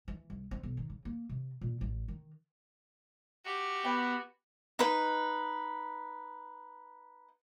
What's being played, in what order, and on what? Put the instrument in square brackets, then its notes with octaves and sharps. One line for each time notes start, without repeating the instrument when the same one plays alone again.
[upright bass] E3
C2
C4
B1
D#3
C#3
A#3
C3
A#2
A1
D#3
[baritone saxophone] F#4 [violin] G4
[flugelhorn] B3 [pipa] G5 B5
[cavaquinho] D#4 B4